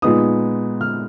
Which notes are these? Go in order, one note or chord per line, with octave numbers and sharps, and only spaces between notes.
A#2 G#3 B3 D#4 D#6
F6